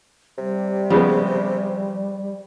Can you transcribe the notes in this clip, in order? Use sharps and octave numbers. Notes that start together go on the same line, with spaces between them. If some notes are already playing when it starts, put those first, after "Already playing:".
C3 G3
C#3 F3 G#3 B3